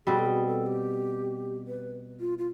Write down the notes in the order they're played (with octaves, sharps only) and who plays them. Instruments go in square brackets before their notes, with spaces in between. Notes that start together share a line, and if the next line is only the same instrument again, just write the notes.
[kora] B2 G3 C4 [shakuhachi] G#4
[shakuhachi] A4
G#4
A4
G4
B4
F4
F4